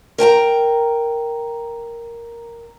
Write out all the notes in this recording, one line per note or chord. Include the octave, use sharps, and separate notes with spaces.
A#4 G5 A5 A#5